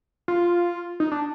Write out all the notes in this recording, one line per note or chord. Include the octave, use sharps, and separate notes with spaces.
F4
D#4
D4